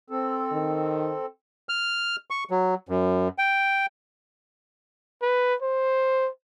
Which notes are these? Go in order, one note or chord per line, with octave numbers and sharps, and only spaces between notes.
C4 A4
D#3
F6
C#6
F#3
F#2
G5
B4
C5